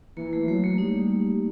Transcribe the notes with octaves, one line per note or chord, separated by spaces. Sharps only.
E3 A#3
A3
F#3 A3
A#3
G3 D#4